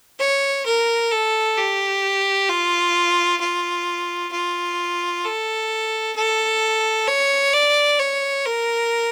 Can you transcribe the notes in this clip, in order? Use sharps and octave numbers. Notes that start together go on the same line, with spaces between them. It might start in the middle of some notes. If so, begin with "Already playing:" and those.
C#5
A#4
A4
G4
F4
F4
F4
A4
A4
C#5
D5
C#5
A#4